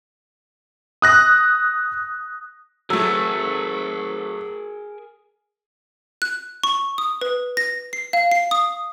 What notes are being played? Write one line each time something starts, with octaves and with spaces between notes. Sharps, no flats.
D#6 F#6 A#6
F#3 A3 G#4 A#4 E6
F#6
C#6
D#6
B4
A#6
C7
F5
C7
D#6